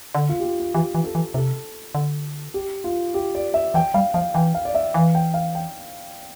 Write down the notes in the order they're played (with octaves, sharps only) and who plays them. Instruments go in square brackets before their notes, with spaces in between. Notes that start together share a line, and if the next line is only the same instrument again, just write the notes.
[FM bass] D3
[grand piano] F4
G4
F4
F4
[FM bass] E3 [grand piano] G4
[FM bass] E3
[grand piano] A4
[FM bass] E3
[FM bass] C3 [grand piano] A4
[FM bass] D3
[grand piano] G4
F4
G4
D5
E5
[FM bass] E3 [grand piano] G5
[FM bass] G3 [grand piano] F5
[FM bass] F3 [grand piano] F5
[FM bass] E3 [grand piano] G5
[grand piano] F5
D5
E5
[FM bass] E3 [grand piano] F5
[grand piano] G5
F5
G5